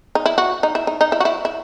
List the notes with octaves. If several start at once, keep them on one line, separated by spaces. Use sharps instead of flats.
D#4
E4
F#4
D#4
E4
D#4
D#4
E4
F#4
E4
E4